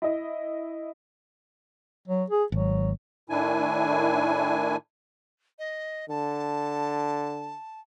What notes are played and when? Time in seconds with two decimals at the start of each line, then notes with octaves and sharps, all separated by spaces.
0.02 E4 D#5
2.08 F#3
2.30 G#4
2.52 G#1 F#3
3.30 A2 D#3 D4 E4 G#5
5.59 D#5
6.09 D3 A5